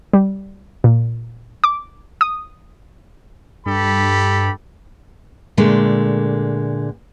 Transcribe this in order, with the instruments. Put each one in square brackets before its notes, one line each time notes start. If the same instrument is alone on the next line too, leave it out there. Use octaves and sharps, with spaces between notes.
[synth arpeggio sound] G3
A#2
D6
D#6
[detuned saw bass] G2 [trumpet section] G4 A4 B5
[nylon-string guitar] A#2 D3 G#3 A3